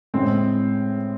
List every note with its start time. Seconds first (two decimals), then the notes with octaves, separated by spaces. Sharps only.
0.14 A2 G#3 C4